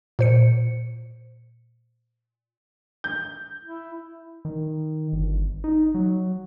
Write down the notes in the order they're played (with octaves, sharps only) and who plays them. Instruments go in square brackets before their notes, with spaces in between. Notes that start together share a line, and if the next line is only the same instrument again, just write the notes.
[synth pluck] A#2 C5 C#7
[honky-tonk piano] G6
[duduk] E4
[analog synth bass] D#3
G1
D#4
F#3